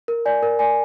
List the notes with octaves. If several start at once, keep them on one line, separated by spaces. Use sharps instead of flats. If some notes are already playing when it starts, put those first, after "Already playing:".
A#4
D5 G#5
A#4
D5 G#5